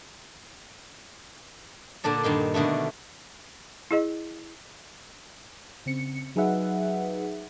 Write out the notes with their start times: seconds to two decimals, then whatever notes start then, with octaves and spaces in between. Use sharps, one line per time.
2.04 A#2 D3 D4 A4
2.23 G2 A#2 D#3 C6
2.54 B2 D3 D#3 A3
3.91 E4 G#4 D#5
5.86 C#3 C4 C#7
6.36 F#3 D#4 G#4 B4 E5 F#5